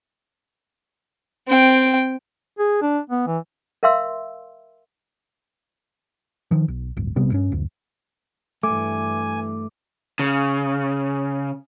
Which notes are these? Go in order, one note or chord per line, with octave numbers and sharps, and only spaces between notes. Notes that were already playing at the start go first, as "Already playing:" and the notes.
C4 G5
G#4
D4
B3
E3
A#4 E5 F5 C6 E6
D#3 F3
B1
D1 G1
A#1 C3 G3 B3
G2 C#4
F#1 D2
G2 E3 A3 G#5 D6
C#3